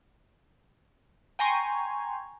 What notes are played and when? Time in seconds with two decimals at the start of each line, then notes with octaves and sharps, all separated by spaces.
1.39 G5 G#5 A#5 C6 C#6